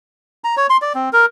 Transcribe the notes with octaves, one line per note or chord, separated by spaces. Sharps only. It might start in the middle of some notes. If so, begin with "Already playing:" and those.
A#5
C#5
C6
D5
C4
A#4